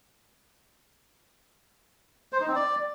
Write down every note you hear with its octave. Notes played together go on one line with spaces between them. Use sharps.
C5
D#4
C4
D5